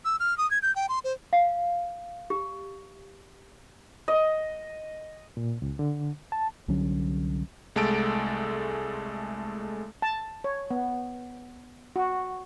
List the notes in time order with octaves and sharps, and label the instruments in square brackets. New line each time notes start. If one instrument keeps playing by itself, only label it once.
[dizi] E6
F6
D#6
G#6
G6
G5
C6
C5
[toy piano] F5
G4
[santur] D#5
[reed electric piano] A#2
C#2
D3
A5
[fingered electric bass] C2 D3 F#3 C#4
[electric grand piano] C2 G#3 A3 A4 A6 D7
[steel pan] A5
C#5
B3
F#4